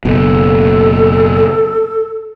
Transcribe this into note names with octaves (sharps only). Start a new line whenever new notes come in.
F#1 B2 A4